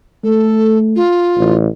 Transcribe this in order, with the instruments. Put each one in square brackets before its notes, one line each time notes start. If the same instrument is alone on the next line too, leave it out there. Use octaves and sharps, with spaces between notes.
[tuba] A3 [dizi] A4
[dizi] F4
[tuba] A1